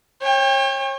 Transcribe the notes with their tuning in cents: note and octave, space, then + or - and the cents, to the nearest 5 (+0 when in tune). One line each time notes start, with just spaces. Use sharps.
C#5 -30 G5 +30